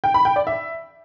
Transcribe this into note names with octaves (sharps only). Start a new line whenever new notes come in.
G5
B5
G5
D5
E5